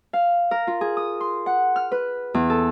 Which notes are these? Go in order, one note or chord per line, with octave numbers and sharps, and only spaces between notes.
F5
A#4
F4
G#4
D#6
C6
F#5
F6
B4
E2
A4